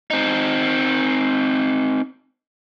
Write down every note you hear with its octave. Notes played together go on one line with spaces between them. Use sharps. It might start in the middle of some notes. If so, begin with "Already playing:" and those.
C4 D#4